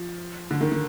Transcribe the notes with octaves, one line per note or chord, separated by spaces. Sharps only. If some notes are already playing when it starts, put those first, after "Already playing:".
Already playing: F3
D3
D#3
D#3